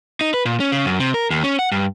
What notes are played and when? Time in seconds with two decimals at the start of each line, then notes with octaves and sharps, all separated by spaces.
0.21 D#4
0.34 B4
0.45 A#2
0.60 C#4
0.72 C#3
0.85 F#2
1.00 C3
1.14 A#4
1.30 D#2
1.43 C#4
1.59 F#5
1.72 G2